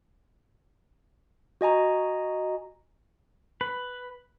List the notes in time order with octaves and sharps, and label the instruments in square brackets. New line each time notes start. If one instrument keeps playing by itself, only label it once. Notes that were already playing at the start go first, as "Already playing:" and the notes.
[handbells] F#4 D#5 G#5 A#5
[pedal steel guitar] B4